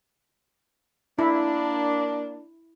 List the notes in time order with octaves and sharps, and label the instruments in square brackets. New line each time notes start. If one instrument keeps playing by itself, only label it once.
[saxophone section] A#3 D4 [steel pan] E4